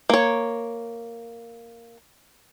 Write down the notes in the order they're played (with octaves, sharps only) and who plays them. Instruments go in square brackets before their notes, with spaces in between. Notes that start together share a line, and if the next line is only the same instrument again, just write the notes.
[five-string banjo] A#3 C#5